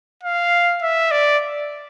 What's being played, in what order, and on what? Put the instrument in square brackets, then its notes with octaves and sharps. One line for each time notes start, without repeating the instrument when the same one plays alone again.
[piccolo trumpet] F5
E5
D5